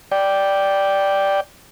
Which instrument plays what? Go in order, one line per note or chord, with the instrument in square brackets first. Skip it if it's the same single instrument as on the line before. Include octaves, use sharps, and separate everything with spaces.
[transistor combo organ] D5 G5